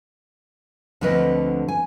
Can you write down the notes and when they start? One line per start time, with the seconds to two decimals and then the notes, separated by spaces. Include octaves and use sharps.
1.01 D2 D3 F3 C4 B4 D#5
1.68 G#5